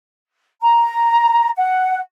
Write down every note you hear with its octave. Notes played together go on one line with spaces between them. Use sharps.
A#5
F#5